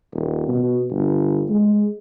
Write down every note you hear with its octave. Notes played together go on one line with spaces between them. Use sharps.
D#1
B2
G1
G#3